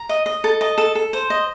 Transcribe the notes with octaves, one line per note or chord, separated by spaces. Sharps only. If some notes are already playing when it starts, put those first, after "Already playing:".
Already playing: A#5
D#5
D#5
A4
D#5 A5
A4
A4
C5
D#5